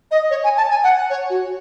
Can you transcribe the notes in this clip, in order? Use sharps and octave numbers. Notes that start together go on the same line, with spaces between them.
D#5
C#5
G#5
A5
G#5
F#5
C#5
F#4